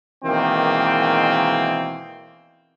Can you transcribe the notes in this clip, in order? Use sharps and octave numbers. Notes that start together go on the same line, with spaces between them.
B2 D#3 E3 G#3 A#3 C4